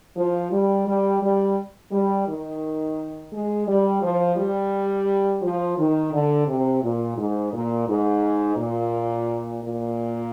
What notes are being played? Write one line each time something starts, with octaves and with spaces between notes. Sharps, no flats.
F3
G3
G3
G3
G3
D#3
G#3
G3
F3
G3
F3
D#3
D3
C3
A#2
G#2
A#2
G#2
A#2
A#2